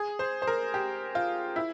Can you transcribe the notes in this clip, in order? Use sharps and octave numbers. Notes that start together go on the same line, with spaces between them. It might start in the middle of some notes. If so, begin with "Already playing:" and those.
Already playing: G#4
C5
C5
A#4
G4
F4
E4